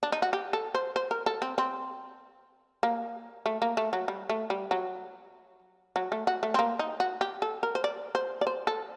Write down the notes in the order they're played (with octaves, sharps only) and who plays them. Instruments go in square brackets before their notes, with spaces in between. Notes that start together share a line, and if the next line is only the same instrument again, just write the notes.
[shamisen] D4
D#4
F#4
G4
A4
C5
C5
A#4
A4
C4
C4
A#3
A3
A#3
A3
F#3
G3
A3
G3
F#3
F#3
A3
F#4
A3
C4
A#3
D#4
F#4
G4
A4
A#4
C5
D5
C5
D5
C5
A4